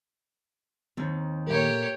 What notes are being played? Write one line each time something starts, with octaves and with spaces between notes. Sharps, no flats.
D#2 D#3 C4
A#2 A3 G4 A#4 C#5